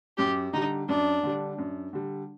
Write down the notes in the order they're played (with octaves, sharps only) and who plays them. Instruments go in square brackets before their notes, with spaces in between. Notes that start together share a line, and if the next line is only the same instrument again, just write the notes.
[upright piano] F#2 [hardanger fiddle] G4
[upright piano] D3 G3 [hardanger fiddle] D#4
[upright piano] F#2 [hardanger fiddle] D4
[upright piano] D3 G3
F#2
D3 G3